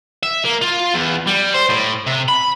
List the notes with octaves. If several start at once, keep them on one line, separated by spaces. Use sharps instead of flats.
E5
A#3
F4
E2
G3
C5
A2
C3
B5